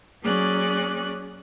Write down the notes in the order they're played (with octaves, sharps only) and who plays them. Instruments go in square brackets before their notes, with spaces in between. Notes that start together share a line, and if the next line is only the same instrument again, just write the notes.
[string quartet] F#3 A#3 C#4 G#4 D5 F#6